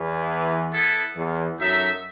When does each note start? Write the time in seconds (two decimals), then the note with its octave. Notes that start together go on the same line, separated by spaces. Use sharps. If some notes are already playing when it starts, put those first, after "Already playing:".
Already playing: E2 E3
0.73 B3 E4 A4
1.16 E2 E3
1.59 F#2 F#3 D#4 A4 E5